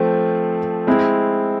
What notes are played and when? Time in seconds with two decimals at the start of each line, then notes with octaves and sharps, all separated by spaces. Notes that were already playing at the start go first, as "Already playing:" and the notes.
Already playing: F3 A3 C4
0.87 G#3 C4 E4